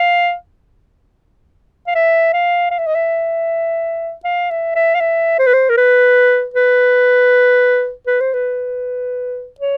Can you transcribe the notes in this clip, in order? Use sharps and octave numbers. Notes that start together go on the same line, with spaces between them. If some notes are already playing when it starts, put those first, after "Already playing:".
Already playing: F5
F5
E5
F5
F5
E5
D#5
E5
F5
E5
E5
F5
E5
C5
B4
C5
A#4
B4
B4
B4
C5
B4
C#5